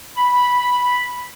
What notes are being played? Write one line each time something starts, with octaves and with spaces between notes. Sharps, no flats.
B5